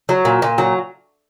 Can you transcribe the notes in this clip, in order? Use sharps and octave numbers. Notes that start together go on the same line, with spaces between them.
F#3
A#2
A#2
F#3